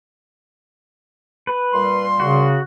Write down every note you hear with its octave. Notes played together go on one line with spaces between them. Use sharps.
B4
A#2 G3 C6
C#3 F#4